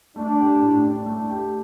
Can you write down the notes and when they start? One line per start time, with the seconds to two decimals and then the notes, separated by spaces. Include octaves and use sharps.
0.16 A3 D4
0.39 G4
0.61 A2
0.84 D4
1.06 A3
1.29 G4